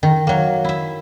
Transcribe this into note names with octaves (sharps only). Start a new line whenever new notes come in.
D#3
F#3 A#3
E4 E5